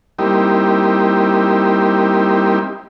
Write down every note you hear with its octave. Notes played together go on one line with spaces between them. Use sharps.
G3 A#3 C4 D#4 E4 G4